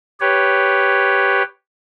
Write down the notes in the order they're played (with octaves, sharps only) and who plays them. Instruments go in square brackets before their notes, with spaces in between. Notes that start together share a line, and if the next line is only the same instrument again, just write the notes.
[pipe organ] G4 B4 C#5